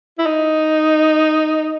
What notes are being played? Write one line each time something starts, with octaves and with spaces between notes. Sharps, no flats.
E4
D#4